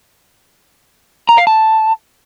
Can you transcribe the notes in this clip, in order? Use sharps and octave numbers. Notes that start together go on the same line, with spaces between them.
A#5
F5
A5